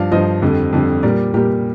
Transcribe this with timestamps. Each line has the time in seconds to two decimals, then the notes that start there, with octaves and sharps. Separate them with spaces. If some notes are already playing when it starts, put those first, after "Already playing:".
Already playing: G2 F3 D5 F5
0.12 G2 F3 C5 D#5
0.42 F2 D3 G3
0.73 F2 D3 G3
1.03 A#2 G3 A#4 D5
1.34 A#2 G3 G4 A#4